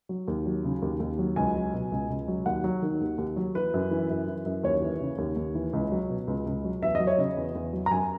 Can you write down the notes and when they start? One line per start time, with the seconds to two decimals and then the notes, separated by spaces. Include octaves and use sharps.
0.09 F#3
0.28 D#2
0.46 F#3
0.64 C#3
0.82 D#2
1.00 D#2
1.19 F#3
1.36 C#2 G#5
1.55 F#3
1.74 B2
1.92 C#2
2.10 C#2
2.28 F#3
2.46 D#2 F#5
2.64 F#3
2.82 D#3
3.01 D#2
3.18 D#2
3.36 F#3
3.55 E3 B4
3.74 F#2
3.91 E3
4.10 F#2
4.27 E3
4.46 F#2
4.63 D#2 C#5
4.82 E3
5.01 C#3
5.18 D#2
5.36 D#2
5.55 E3
5.73 C#2
5.92 F#3
6.10 B2
6.27 C#2
6.46 C#2
6.64 F#3
6.82 E2 E5
6.95 F#3 D#5
7.07 C#5
7.18 C#3 D#5
7.37 E2
7.55 E2
7.73 F#3
7.86 A#5
7.91 F#2 G#5